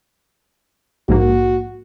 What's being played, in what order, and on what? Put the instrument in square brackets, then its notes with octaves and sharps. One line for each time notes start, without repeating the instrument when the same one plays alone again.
[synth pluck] A#1 G#2 A#3 [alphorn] F#4